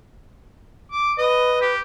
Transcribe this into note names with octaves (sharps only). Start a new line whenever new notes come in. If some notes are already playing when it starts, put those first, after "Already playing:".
D6
B4 D#5
G4